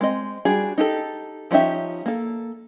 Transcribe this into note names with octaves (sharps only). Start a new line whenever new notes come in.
G#3 C4 D#5
G3 D4 F#4 G#4
D#4 G4 A4
F3 C#4 D#4 G4 E5
A#3 A4